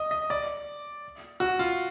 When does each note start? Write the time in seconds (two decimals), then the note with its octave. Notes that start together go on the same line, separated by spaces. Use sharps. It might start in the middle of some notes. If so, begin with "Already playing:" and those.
Already playing: D#5
0.11 D#5
0.30 D5
1.40 F#4
1.59 F4